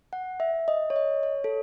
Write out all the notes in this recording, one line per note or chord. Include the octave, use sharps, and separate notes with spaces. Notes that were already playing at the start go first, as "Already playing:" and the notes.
F#5
E5
D#5
C#5
D#5
C#5
A4